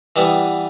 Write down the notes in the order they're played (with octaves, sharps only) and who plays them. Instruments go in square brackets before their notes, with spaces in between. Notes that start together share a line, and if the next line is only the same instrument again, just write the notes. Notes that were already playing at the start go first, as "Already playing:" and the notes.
[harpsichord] E3 G3 B3